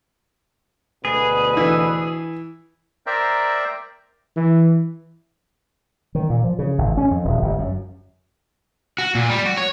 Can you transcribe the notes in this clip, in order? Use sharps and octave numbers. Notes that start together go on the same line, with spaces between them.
D2 B2 G#4 B4
E3
A#4 C5 D5 E5 G5 A#5
E3
D#3
A#2
F3
C#3
G#1
C#4
F2
D#1
G1
F#2
F#4
A#2
G3
F#4
C#5